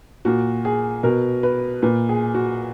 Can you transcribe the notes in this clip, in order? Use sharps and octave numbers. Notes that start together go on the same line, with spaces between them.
A#2 F#4
G#4
B2 A#4
B4
A#2 B4
G#4
F#4